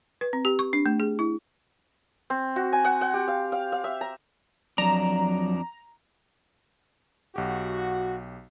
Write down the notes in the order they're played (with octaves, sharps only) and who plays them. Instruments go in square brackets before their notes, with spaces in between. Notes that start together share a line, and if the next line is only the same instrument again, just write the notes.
[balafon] B4
C4
G4
C#6
D4
A3
G#4
E4
[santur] C4
F#4
G#5
F#5
F#5
G4
F5
F5
F5
E5
A#5
[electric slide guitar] F2 D4 [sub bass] F#3 [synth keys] A#5
[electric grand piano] B1 G4 [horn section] F#4